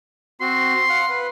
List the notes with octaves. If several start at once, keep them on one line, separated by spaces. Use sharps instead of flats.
C4 F#4 C6
F5 F#5
B4